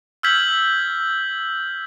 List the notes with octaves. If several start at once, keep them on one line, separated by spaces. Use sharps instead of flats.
E6 F6 G6 G#6 B6 F#7